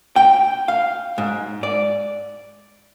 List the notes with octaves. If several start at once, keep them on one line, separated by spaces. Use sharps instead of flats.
G5
F5
G#2
D5